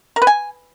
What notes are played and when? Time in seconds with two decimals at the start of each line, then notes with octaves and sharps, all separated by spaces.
0.16 A#4
0.22 B4
0.27 G#5